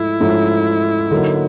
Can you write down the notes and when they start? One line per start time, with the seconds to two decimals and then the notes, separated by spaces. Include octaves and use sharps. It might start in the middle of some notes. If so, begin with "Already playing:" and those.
Already playing: G#2 F3 A3 E4
0.20 G#2 F3 A3 C#4
1.11 D3 F#3 A#3 D#4